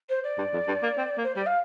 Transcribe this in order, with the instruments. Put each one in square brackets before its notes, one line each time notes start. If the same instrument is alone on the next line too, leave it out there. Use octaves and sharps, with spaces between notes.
[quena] C5
D5
[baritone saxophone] G2
F2
G2
A#3
C4
A#3
[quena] C5
[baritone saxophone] G3 [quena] D5
[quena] F5